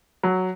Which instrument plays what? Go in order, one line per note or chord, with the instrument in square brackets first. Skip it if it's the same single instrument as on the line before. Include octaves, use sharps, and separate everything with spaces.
[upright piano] F#3